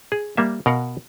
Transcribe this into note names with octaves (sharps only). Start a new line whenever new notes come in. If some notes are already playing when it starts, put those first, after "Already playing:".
G#4
G3 A#3 E5
B2 A#4 F5 F#5